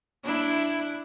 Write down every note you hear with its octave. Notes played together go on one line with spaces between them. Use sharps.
D4 E4